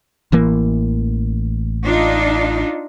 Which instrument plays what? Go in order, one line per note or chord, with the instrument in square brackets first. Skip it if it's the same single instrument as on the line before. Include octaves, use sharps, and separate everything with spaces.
[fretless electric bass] A1 E3 A#3
[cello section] D4 D#4 F4